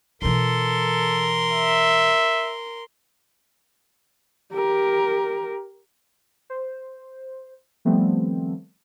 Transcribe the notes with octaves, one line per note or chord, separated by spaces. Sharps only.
B2 E3 A4 A#4 C6
E5
G4 A#4
C5
D#3 F3 G3 A3 B3 C4